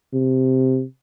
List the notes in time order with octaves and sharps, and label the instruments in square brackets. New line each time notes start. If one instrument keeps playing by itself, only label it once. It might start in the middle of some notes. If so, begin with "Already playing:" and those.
[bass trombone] C3